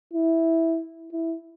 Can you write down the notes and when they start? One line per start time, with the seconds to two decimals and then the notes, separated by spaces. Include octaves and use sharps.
0.13 E4
1.12 E4